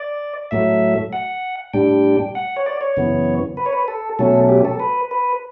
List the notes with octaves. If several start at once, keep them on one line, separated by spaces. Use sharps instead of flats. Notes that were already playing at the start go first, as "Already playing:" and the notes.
Already playing: D5
A2 F#3 A3 E5
F#5
A2 G3 D4 G5
F#5
C#5
D5
C#5
F#2 C#3 E3 B3
B4
C#5
B4
A4
B2 F#3 A3 C#4 A4
G4
A4
B4
B4